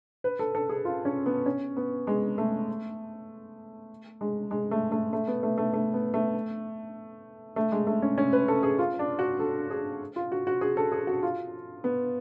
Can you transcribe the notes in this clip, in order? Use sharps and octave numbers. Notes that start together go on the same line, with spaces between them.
B4
A4
A4
G#4
F4
C#4
B3
C#4
B3
G#3
A3
G#3
G#3
A3
A3
A3
B3
A3
A3
A3
B3
A3
A3
G#3
A3
C#4
C#4
B4
A4
G#4
F4
D4
F#4
A4
G#4
F4
F#4
F#4
G#4
A4
G#4
F#4
F4
B3